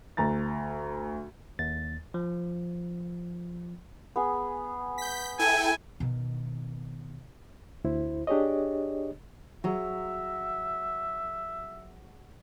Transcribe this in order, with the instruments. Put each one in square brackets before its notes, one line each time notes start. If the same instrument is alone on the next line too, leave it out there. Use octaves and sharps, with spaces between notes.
[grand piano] D2 A#5 A6
[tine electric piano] D#2 A6
F3
[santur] B3 G#4
[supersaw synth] G6 B6
[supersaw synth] E4 A4 G5 [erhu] G#5
[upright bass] B2 D#3
[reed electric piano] D2 E4 C5
D4 G4 G#4 C#5 D#5
[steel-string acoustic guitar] F#3 A#5 [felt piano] F#4 G#4 [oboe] E5